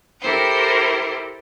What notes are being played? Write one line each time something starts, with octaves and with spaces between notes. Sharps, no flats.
E4 G4 A4 A#4 C5 G5